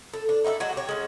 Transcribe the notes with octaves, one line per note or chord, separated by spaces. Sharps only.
A4
D4
D#4 E4 F#4 A4
F#3 G#3 F#4
G4 C#5
G#3 C#4